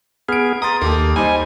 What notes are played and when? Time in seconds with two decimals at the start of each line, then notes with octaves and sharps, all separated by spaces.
0.29 B3 G#4 F6 D7
0.62 A#5 C6 D#6 A6
0.81 D#2 A#3 G4 A4
1.16 G3 D#4 C5 G#5